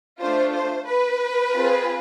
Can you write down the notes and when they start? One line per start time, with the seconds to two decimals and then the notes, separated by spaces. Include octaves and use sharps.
0.20 A3 D4 F4 C5
0.54 C5
0.88 B4
1.55 C4 F4 G#4